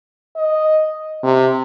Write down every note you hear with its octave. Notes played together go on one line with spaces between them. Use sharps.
D#5
C3